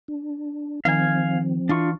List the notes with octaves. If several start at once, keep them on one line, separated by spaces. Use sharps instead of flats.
D4
D#3 F3 C4 F5 G#5
E3 D4 F4 C#6